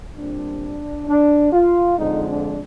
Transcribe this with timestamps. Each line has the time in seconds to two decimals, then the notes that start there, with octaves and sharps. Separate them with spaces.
0.16 A#2 G3 C4 D4
1.07 D4
1.52 F4
1.97 F2 D3 F3 G#3 D#4
2.28 D4